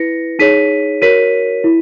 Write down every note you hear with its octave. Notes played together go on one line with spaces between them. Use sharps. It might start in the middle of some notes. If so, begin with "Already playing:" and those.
Already playing: E4 B4 A#6 C#7
D#4 G#4 C#5 B6 D#7
F#4 A#4 C#5 B6 D#7
E4